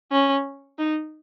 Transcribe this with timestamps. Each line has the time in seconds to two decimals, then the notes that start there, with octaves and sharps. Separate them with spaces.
0.12 C#4
0.79 D#4